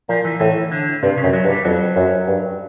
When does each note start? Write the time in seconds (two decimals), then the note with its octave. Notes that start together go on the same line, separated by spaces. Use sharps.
0.09 A#2 F3
0.25 E3
0.40 A2 E3
0.72 D3
1.03 G2 C3
1.17 C#3
1.23 F#2
1.33 F#3
1.44 G2
1.50 G3
1.65 F2 F#3
1.96 F#2
2.27 G2